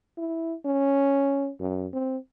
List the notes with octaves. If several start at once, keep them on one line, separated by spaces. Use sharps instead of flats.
E4
C#4
F#2
C4